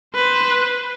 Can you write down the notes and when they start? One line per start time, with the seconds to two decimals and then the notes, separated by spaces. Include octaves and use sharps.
0.15 B4 C5